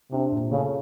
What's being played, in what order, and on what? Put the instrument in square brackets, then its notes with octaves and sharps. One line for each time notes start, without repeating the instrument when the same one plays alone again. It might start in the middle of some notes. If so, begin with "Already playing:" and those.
[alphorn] C3 [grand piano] D4
[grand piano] A#2
[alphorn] C#3 [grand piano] A3